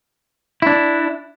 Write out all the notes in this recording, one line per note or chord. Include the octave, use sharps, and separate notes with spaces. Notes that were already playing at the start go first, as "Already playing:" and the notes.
D4 E4